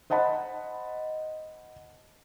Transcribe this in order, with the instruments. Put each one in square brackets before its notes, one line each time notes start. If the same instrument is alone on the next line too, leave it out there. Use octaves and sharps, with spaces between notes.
[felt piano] C5 D#5 F#5 A5 B5